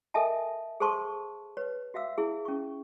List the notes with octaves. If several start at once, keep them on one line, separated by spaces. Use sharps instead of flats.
A4 A#4 D#5 E5 G#5 A5
G#4 A4 C5 A5 C6 C#6
B4 C#5
F#4 E5 F5 E6
E4 G#4
C#4 C#6